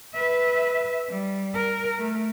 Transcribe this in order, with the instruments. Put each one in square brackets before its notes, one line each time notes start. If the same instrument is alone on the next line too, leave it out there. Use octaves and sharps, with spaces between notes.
[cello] B4 E5
G3
A#4
A3